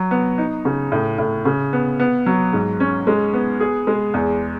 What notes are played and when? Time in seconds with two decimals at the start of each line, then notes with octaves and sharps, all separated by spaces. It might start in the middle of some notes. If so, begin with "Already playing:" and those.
Already playing: F#3
0.11 B3
0.38 D#4
0.65 C#3
0.92 A2
1.18 A2
1.45 C#3
1.73 B3
2.00 B3
2.26 F#3
2.53 G#2
2.80 C#4
3.07 G#3
3.34 B3
3.60 G#4
3.87 G#3
4.14 E2